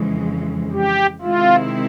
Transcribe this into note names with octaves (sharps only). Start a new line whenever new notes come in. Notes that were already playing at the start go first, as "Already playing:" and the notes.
Already playing: F2 C#3 E3 G#3
G4
C3 D#3 G#3 C4 E4 F4